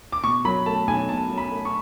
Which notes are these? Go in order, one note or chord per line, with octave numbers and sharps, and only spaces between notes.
D6
B2 C#6
F#3 B5
A3 A5
B1 G#5
B2 A5
F#3
B5
A3
C#6